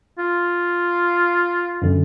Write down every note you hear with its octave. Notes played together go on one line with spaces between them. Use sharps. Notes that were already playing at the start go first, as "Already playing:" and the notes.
F4
F#2 D3